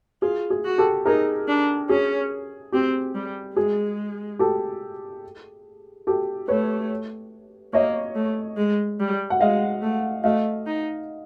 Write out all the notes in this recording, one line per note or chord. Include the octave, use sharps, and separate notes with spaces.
F4 G#4
G#4
F#4
G4 A4
D#4 G#4 A#4
D4
C#4 G#4
C4 G4
G3
G#3 G#4
G4 A4
G4 A4
A3 B4 C#5
A#3 C#5 D#5
A3
G#3
G3
F#5
G#3 D#5 F5
A3
A3 D#5 F5
D#4